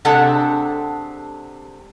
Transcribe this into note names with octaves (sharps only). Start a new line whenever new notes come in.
C3 G#3 D4 A4 F#5